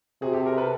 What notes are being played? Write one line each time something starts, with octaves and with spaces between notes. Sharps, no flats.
C3 F#4 G#4
G4 A4
G#4 A#4
A4 B4